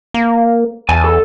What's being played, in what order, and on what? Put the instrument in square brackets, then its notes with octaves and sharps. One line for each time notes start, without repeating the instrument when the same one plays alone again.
[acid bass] A#3
[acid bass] E2 [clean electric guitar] G#5 A5
[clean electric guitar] A4